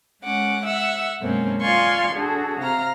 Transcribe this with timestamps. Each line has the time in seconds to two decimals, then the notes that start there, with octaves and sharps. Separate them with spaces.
0.23 G#3 C#4 F#5 D6
0.64 E5 F#5 E6
1.21 F#2 B2 G#3 A#3 C4 C#4
1.62 F4 D5 F5 G#5 C6 C#6
2.13 D4 F#4 G#4 A4
2.60 C3 F5 A#5 F6